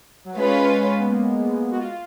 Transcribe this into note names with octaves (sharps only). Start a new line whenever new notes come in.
F#3
G#3 C#4 F4 B4 F5
B3
A#3
F#4
F4